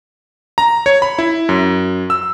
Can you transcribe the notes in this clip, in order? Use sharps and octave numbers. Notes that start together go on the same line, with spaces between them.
A#5
C#5
B5
E4
F#2
E6